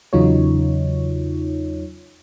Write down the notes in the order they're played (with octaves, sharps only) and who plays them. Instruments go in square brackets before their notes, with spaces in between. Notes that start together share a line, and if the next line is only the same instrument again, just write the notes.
[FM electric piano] E2 C#3 F#3 D#4 F4 C#5